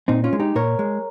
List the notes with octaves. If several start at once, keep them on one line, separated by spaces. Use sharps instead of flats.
A#2 C4 D#4
C#4 F4
G#3
D#4 G4
A#2 A#4 C#5
G#3